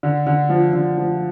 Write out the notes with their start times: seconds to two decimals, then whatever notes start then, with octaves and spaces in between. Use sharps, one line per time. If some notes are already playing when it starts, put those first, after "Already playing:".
0.03 D3
0.27 D3
0.49 F3
0.73 D3
0.98 F3